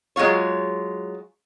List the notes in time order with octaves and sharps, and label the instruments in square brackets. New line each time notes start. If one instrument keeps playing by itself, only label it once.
[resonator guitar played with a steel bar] F#3 G#3 A#3 F4 C#5